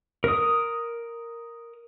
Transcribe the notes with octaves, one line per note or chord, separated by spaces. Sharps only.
A#4 D#6